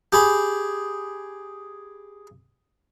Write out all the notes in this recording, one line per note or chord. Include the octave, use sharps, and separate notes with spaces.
G4 G#4 B5